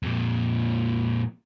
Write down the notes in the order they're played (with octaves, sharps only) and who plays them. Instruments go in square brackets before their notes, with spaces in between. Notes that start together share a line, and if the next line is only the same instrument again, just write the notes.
[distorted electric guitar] F2 A#2